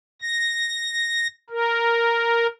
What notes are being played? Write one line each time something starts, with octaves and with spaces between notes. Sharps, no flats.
A#6
A#4